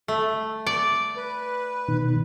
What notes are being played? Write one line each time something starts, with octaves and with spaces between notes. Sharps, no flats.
A3
D5
B4
B2 D#3